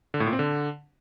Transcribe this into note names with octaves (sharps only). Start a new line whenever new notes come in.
D3
A2
A#2
C4
D3